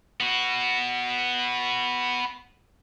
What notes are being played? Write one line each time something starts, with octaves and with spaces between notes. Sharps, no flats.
B3 F#4